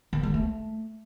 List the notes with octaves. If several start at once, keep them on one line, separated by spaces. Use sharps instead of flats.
D#3
G#3
A3